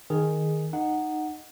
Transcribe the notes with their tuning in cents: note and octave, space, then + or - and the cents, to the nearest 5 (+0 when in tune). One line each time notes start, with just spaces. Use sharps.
D#3 +0 G#4 +0
D#4 -15 F#5 +0